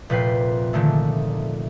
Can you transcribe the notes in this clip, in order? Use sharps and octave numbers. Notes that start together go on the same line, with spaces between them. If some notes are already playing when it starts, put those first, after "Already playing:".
F1 A#2 B4 G5 C7
A#2 D3 D#3 G#3 A3